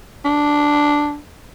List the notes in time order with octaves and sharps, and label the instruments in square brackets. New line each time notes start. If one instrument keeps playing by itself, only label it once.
[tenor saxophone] D4